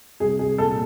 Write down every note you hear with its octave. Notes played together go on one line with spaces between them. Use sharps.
C2 G#4
G#4
A#2 A4